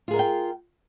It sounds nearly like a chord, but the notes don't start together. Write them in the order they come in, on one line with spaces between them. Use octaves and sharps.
F4 G#4 A#4 F5 G5